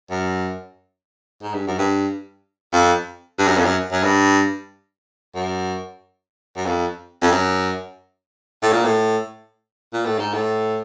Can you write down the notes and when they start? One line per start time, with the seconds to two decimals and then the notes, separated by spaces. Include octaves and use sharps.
0.11 F#2
1.43 G#2
1.54 G2
1.67 F#2
1.78 G2
2.73 F2
3.39 G2
3.48 F#2
3.57 F2
3.65 F#2
3.92 F#2
4.03 G2
5.35 F#2
6.57 F#2
6.66 F2
7.22 F2
7.31 F#2
8.62 A2
8.73 A#2
8.84 A2
9.93 A#2
10.06 A2
10.19 G#2
10.34 A2